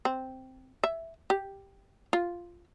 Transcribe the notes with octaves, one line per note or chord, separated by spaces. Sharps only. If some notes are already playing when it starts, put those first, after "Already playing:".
C4
E5
G4
F4